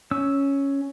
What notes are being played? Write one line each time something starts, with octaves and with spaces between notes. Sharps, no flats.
C#4 E6